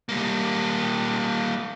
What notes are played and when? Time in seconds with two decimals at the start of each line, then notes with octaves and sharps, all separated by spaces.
0.09 G3 A#3